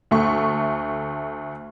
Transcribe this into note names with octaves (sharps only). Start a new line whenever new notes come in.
D2 A3 C#6